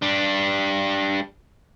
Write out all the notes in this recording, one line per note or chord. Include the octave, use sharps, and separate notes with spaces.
G3 D4